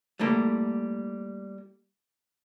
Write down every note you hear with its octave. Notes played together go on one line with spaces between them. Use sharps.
G3 A3 A#3 E4